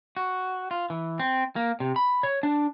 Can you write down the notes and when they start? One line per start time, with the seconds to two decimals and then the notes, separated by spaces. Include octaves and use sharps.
0.17 F#4
0.71 F4
0.90 E3
1.20 C4
1.56 A#3
1.80 C3
1.96 B5
2.23 C#5
2.43 D4